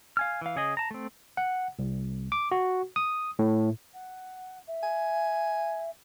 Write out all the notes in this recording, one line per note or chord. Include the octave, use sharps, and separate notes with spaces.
F5 G#5 F6
E3 F5
C#3 G#4 D#5
A5 A#5
A3 C4
F#5
C2
D6
F#4
D#6
A2
F#5
E5
G#5